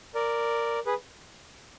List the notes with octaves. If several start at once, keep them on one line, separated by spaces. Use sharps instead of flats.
A#4 D5
G#4 B4